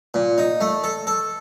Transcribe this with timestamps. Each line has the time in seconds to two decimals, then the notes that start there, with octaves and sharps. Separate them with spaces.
0.14 A#2
0.38 D#4
0.61 A3
0.84 A4
1.07 A4